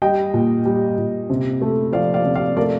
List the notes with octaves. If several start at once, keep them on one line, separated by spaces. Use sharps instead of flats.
G3 D#5 G5
A#2
G3
A#2
C3
A3
F3 D5 F5
D5 F5
C3
D5 F5
A3 A#4 D5